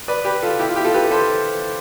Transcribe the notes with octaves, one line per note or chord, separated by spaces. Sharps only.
B4 D5
G4 B4
F4 A4
E4 G4
F4
E4 G4
F4 A4
G4 B4
A4 C5